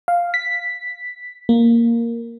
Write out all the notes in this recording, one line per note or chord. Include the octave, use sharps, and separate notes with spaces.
F5
B6
A#3